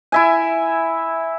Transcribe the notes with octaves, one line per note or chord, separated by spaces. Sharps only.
E4 E5 G#5